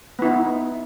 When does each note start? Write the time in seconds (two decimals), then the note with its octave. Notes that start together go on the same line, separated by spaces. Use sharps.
0.19 B3
0.22 E4
0.25 D#4